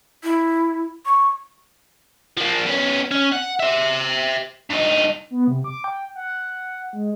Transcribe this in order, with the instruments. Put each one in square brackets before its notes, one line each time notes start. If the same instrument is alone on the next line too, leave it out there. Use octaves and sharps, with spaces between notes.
[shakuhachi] E4
C#6
[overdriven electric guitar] F3 A#3
B3 C#4
C#4
F#5
C5 E5
G2 D#4
[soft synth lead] B3
C3
D6
G5
F#5
G#3